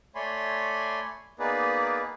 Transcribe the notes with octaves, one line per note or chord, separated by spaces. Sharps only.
A3 C#5 D5 G#5 B5 C6
A#3 B3 D#4 G#4 B4 D5